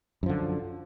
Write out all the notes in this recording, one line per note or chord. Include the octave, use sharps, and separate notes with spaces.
F#2 D3 F3